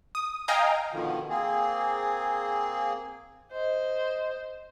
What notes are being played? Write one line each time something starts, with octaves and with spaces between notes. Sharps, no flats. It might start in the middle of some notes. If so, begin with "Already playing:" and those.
D#6
D#5 F5 G5 G#5 A#5 D#6
B2 D3 D#3 F3
A#3 C4 G#4
C5 D#5